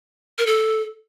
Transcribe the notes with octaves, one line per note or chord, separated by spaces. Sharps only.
A#4
A4